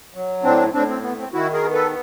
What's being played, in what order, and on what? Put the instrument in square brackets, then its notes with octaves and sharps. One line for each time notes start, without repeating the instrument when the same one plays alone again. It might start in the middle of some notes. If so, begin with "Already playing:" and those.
[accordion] F#3
A2 C4 D4
A2 C4 D4
C4
B3
C4
D#3 E4 F#4
G#4 A#4
B3
A4 B4